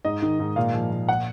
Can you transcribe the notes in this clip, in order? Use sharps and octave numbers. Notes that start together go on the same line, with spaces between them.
G#2 D#5
D#3
G#2
A#2 F5
F3
A#2
F#5